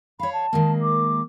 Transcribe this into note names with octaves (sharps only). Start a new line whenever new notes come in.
C#5 F5 B5
A5
D#3 G#3 A#3
D6